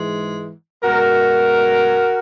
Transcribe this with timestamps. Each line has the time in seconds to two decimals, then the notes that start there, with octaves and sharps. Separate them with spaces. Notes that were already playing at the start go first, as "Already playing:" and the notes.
Already playing: G#2 E3 G#3
0.83 B2 G#3 F#4 A#4